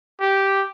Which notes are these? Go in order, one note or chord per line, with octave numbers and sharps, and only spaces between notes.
G4